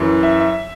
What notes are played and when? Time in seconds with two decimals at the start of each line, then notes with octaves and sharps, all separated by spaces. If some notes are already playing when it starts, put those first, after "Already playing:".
Already playing: F#2 E3
0.23 E5
0.40 E5